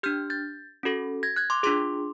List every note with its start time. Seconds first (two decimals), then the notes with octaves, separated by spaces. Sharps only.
0.03 D4 G4 F6 G6
0.30 G6 A6
0.83 C#4 F#4 A4
1.23 G#6 A#6
1.36 F#6 G#6
1.50 C6 D6
1.63 D4 F4 G#4 C6 D6